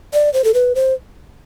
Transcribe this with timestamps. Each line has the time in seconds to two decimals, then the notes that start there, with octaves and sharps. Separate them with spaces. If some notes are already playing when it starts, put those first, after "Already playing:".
0.13 D5
0.34 C5
0.44 A4
0.54 B4
0.75 C5